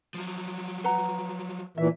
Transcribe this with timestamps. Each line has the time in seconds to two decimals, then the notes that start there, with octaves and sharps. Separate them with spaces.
0.14 F3 F#3
0.84 B4 F#5 A#5
1.78 A#2 E3 E5